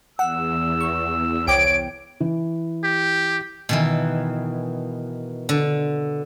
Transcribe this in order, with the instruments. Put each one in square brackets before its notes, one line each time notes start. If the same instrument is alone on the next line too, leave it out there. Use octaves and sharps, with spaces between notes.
[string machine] E2 [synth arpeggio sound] F#5 [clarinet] E6
[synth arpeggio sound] C#6
[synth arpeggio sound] C2 G5 D6 [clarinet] C#5 [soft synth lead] D7
[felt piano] E3
[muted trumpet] G4
[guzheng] B2 D#3 E3
D3